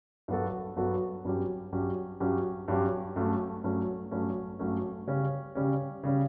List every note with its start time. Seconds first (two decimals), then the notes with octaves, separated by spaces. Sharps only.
0.28 G2 F#3 B3 F#4 A4
0.76 G2 F#3 B3 F#4 A4
1.25 G2 F#3 C#4 G4
1.73 G2 F#3 C#4 G4
2.20 G2 F#3 C#4 G4
2.68 G2 F#3 C#4 G4
3.16 G2 F#3 A3 C#4
3.64 G2 F#3 A3 C#4
4.11 G2 F#3 A3 C#4
4.59 G2 F#3 A3 C#4
5.07 C#3 G3 C#4
5.55 C#3 G3 C#4
6.03 C#3 G3 C#4